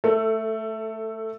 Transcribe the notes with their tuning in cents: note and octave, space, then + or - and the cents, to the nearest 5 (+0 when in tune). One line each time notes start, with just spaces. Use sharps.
A3 +0 A4 +20